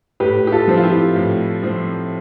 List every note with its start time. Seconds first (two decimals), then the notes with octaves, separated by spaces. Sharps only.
0.20 A2 G4 B4
0.47 G4
0.52 F4 A4
0.67 F3 C4
0.77 F4
0.83 E4 G4
1.16 A2
1.63 F3 C4